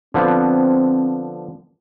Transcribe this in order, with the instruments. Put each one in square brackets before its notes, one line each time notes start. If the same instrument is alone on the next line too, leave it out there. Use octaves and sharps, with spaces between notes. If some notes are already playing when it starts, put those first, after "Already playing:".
[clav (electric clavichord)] D3 F3 B3 [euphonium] C4